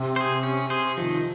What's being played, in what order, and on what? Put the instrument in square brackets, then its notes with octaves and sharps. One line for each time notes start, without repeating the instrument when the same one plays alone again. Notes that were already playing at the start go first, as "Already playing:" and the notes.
Already playing: [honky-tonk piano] C3
[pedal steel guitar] G#4 C5
C#4
G#4 C5
[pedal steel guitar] D#3 [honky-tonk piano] F3